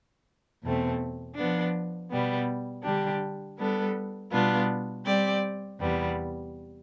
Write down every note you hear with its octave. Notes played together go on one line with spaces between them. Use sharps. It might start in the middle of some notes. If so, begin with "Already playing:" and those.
E2 B2 A3 C4
F3 B3 D4
B2 G3 B3
D3 G3 D4 G4
G3 B3 D4 A4
B2 G3 B3 D4 F4
G3 C4 G4 D5
E2 C3 G3 B3